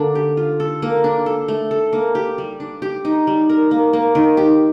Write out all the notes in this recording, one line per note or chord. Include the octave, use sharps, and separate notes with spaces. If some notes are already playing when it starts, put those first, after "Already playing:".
Already playing: D3 A#3 D4
G4
F4
A4
A#3
D4
A4
A3
A4
A#3
G4
G3
D4
G4
D#4
G3
A#4
A#3
A#3
D#3
G4